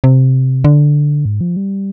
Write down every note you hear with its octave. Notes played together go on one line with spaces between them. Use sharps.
C3
D3
G#2
F3
G3